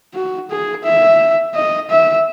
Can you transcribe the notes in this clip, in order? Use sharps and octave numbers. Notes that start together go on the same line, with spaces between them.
F#4
G#4
E5
D#5
E5